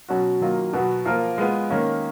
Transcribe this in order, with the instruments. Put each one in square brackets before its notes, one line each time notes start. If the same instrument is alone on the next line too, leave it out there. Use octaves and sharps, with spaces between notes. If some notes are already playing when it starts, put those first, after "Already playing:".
[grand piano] B2 F#3 C#4 F#4
D#3 F#3 A#3 F4
B2 F#3 B3 F#4
F3 A#3 F4 A#4
G#3 B3 F4
D#3 A#3 C#4